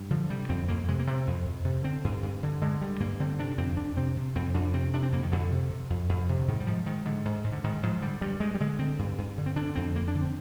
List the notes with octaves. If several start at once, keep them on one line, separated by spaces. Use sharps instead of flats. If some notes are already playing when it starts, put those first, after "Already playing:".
Already playing: G2
D3 F3
C3 G3
F2 C4
F2 A#3
C3 G#3
A#3
C3 C4
F2
F2
C3
D3 C4
G2
G2
D3
D3 G#3
G2 G3
G2 A#3
D3 C4
C3 D4
F2 C4
F2 D4
C3 C4
C3
F2 C4
F2 D4
C3 C4
C3 D4
C4
F2 A#3
D#3
F2 D3
C3
C3
F2
F2
C3
D3
G#2 D#3
G3
G#2 F3
G#2 D#3
G#2 D3
G#2
G#2
D3
G#2 D#3
G#2 F3
D3 G3
G2 G3
G2 G#3
G3
D3 G#3
D3 C4
G2
G2
D3
C4
D3 D4
F2 C4
F2 A#3
D4
D3
C4